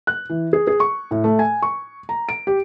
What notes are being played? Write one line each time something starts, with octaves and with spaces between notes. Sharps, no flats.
F#6
E3
G#4
G#4
C#6
A2
A3
G#5
C#6
A#5
D7
G4